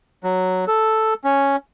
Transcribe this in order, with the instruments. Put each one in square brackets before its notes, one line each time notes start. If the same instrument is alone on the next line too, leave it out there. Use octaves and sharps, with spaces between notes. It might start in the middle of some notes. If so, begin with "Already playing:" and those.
[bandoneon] F#3
A4
C#4